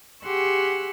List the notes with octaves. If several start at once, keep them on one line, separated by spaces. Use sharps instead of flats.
G4 G#4 F#5 C6 C#6 E6